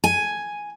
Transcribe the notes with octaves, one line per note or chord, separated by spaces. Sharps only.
G#5